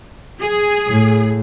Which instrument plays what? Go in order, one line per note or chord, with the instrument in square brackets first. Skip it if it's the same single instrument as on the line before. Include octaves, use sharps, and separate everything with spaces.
[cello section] G#4
[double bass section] A2